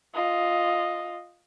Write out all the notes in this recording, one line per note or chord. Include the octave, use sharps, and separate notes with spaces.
F4 D#5